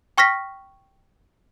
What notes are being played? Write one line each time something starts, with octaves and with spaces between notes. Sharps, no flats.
G5 C#6 F6 A#6 B6